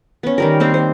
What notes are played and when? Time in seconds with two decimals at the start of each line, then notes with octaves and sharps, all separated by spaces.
0.23 B3 C#4
0.38 D#3 G3 A#4
0.60 A#3 C4 C5
0.74 C5